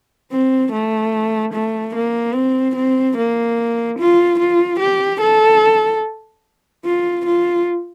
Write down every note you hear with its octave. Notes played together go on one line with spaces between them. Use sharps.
C4
A3
A3
A#3
C4
C4
A#3
F4
F4
G4
A4
F4
F4